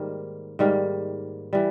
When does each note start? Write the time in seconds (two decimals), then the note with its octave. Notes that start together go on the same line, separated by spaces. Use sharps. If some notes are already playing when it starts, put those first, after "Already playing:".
Already playing: G#2 D#3 G3 A#3
0.59 G#2 D#3 G3 A#3
1.53 E3 G3